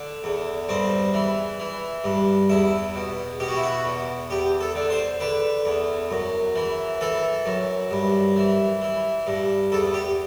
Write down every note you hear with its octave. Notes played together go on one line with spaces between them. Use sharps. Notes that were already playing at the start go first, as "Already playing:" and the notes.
Already playing: D3
E2
G2 C4
E3
E3
G2
E2 E4
B2
B2 G4
F#4
E4
F#4
E2
E2 G4
A4
D3
C5
D3 B4
E2
F#2
E3
E3 A4
F#2
G2
E3
E3
G2
E2 A4
G4